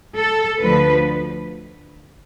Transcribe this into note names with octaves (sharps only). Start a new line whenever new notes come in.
A4
D2 D3 F3 B4